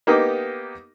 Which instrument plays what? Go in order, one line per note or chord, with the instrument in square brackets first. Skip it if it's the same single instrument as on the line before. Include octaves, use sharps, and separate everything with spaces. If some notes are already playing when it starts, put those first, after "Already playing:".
[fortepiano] A#3 B3 D#4 G4 D#5